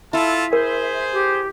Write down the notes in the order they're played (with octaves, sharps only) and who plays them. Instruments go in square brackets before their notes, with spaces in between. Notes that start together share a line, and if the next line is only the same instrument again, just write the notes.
[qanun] E4 [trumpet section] F4 A4 A5 [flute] E5
[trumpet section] G#4 C5 [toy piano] A#4
[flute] G4